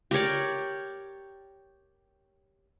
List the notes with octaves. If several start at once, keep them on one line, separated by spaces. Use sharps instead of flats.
G4 A#4 C#5 D5